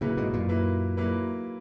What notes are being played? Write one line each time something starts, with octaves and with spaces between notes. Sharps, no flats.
A#2 C#3 F#3 A#3 E4 B4
G#2 B2
F#2 A#2
F#3 A#3 E4 B4
F#3 A#3 E4 B4